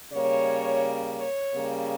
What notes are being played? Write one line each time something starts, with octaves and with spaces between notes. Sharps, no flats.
C#3 G3 A#3 C#5
C#5
C#3 G3 A#3